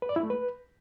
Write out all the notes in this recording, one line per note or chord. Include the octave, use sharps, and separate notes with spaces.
B4
D5
E4
A3
B4